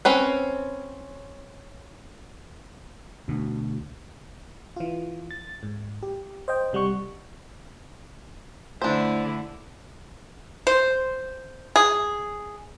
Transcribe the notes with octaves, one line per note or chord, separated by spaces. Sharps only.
C4 C#4 B4
D2 B2
E3 F4
A6
G#2
G4
C5 D#5 G5
C3 G3 F#5 C#6 C#7
D3 A3 D4 E4 C5
C5
G#4